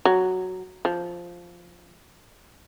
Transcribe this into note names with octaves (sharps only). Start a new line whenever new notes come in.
F#3
F3